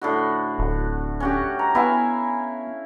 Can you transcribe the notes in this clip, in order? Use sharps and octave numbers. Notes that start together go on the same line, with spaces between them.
A2 D3 F#4
D1
C#4 F#4 G4
A#5
B3 E4 F5 G#5